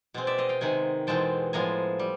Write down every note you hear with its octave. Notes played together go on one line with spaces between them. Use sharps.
B2 G#3 C4
D5 E5
D#5 F5
F5 G5
C3 D#3 G#3 F#5 G#5
E2 B2 G#3 C4 G5 A5
A2 F3 G#3 B3 G#5 A#5
G3